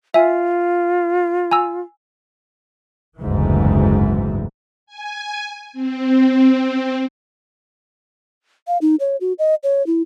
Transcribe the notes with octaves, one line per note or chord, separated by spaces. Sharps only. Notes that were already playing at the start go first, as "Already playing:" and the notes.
F4 E5 G#5
G#5 A#5 E6
F#1 D2 G#2 E3
G#5
C4
F5
D#4
C#5
F#4
D#5
C#5
E4